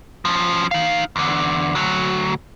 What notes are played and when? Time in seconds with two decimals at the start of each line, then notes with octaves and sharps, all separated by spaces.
0.25 F3 C#4
0.71 D#4 F5
1.16 E2 D3
1.75 D2 F#3